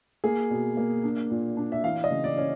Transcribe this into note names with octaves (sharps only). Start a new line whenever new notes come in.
A#3 G#4
B2
A#3
D4
A#2
D4
E5
E3 F5
D#5
C#3
D5
C#4